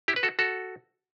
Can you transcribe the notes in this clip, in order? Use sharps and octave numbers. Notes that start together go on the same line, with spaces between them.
E4 G4
B4
F#4 A4
F#4 A4